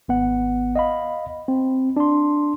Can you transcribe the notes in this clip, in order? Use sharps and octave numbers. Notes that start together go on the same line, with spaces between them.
G#1 B3 F#5
D#5 F5 B5
C4
D4 C6